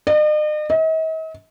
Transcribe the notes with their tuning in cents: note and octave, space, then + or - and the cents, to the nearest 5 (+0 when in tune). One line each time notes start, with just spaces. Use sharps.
D#5 -45
D#5 +45